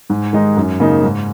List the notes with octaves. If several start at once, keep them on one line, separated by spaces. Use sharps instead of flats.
G#2
D#3 G#3 D#4
F#2
C#3 A#3 D#4
G#2